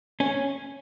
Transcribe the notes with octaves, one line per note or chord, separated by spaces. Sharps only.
C#4